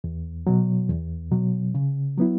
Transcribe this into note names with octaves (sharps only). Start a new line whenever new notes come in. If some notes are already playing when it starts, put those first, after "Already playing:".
E2
B2 F#3
E2
B2 F#3
C#3
F#3 B3 E4